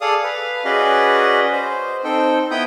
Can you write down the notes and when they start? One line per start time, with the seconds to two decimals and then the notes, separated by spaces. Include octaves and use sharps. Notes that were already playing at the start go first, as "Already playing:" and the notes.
0.01 G#4 A4 D5 F5 D#6
0.23 B4 F5
0.65 C#4 F#4 G#4 B4 D5 D#5
1.52 C5
2.04 C4 D#4 A4 C5 G5
2.51 B3 E4 G5 B5 D#6 G6